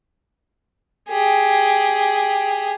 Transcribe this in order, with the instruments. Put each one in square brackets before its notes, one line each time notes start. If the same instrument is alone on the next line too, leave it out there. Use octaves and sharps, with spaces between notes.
[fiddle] G4 G#4